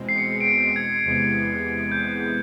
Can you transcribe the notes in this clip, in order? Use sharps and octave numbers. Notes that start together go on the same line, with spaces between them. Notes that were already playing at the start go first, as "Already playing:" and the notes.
Already playing: E2 B2 G#3 C4
C7
C#7
D7
C#7
G#6
E2 C3 E3 G#3 B3
G6